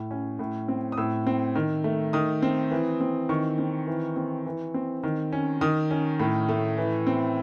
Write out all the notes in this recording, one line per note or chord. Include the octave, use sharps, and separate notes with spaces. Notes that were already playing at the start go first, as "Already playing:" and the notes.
Already playing: A2
C#4
A2
C4
D#6
A2 E6
C4
D#3
A3
D#3 D#6
C4
E3
C4
D#3 C#6
C4
E3
C4
E3
C4
D#3
C#4
D#3 D#6
C#4
A2
A3
E3
C4